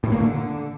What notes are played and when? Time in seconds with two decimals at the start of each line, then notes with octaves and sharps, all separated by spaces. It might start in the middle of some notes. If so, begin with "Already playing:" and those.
0.04 A2
0.12 A#3
0.20 D3